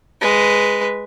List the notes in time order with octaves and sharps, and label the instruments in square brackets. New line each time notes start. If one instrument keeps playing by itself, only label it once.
[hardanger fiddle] G#3 B4